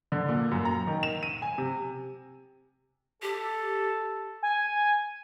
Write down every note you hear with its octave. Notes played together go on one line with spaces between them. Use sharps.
D3
A#2
F#2
A#5
D#3
E7
D#7
G#5
C3
G4 A4
G#5